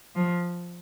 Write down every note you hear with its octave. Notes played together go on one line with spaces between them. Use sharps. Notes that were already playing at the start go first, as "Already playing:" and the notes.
F3